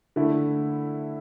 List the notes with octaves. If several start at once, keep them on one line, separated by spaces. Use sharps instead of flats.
D3 A3 E4